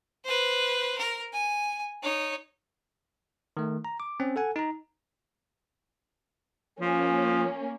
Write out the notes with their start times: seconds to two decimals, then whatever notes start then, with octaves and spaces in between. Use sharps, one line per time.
0.25 B4 C5
0.98 A#4
1.33 G#5
2.03 D#4 C#5
3.57 D#3 A3
3.85 A#5
4.00 D6
4.20 C4 C#4
4.36 A4 F#5 G#5
4.56 D#4 A#5
6.80 F3 A#3 C#4